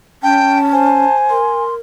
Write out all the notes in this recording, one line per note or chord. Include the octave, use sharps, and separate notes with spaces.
C#4 G5 A5
C5 G#5
A#4 C6